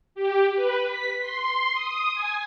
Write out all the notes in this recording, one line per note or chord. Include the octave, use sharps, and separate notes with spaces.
G4
B4
B6
C6
D#6
G#5